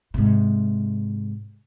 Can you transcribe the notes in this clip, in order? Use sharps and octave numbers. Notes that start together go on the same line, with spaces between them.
G#2 C3